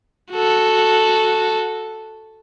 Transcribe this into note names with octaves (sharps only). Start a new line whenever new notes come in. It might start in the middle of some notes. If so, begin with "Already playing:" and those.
F#4 A4